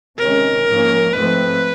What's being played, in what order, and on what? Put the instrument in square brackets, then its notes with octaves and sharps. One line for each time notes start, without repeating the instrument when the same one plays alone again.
[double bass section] C3 D#3 G#3 C#4 [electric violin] A#4
[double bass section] G#2 F3 A#3 C#4
[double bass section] G#2 F3 A3 C4 [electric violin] B4